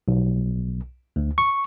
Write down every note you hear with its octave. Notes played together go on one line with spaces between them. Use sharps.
B1
D2
C#6